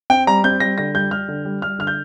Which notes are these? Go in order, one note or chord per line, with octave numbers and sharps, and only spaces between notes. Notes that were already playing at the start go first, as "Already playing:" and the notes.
C4 G5
G3 A#5
C4 G6
G3 A#6
D3 A#6
G3 G6
G3 F6
D3
G3
G3 F6
D3 F6
G6